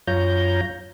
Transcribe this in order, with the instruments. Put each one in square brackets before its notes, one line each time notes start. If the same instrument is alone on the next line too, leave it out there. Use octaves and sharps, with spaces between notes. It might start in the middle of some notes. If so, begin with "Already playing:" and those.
[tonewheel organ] F#2 F4 C#5 A#5 G6